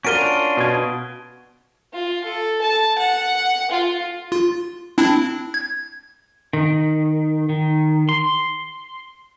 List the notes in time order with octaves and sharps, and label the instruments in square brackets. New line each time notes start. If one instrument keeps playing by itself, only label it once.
[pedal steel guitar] C#4 D4 F4 [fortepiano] F#4 A#4 [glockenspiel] D7 D#7 G7
[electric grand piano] B2 G#6
[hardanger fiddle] F4
A4
A5
F#5
F4
[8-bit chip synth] F4
C4 D4 E4
G#6
[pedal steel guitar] D#3
D#3
C6